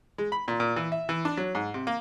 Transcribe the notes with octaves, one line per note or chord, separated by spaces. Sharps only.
G#3
B5
A#2
A#2
E3
E5
E3
D4
F#3
G#2
C3
A#3